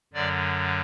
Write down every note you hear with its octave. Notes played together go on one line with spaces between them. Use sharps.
F#2 D3 F#3 D5